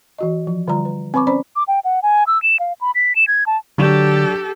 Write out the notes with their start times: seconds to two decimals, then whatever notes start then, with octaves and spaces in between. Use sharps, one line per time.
0.18 E3 F#4 D#5
0.47 F3
0.68 D3 G3 F4 D5 A#5
0.85 B4
1.14 C4 B4 B5 C#6 D6
1.27 C#4 C5 D5 B5
1.56 D6
1.68 G5
1.85 F#5
2.03 G#5
2.27 E6
2.43 E7
2.60 F5
2.81 B5
2.95 B6
3.16 E7
3.28 G#6
3.47 A5
3.78 D3 F#3 D4 G4 A4 E7